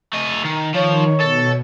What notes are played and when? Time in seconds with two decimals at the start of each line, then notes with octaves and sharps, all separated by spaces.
0.13 A3 D#5
0.45 D#3
0.74 D#3 F3 C#5
1.21 B2 A4